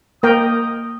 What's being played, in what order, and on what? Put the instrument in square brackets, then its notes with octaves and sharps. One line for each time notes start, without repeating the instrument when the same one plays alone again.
[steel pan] A#3 A#4 G5 [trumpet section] D#5 D#6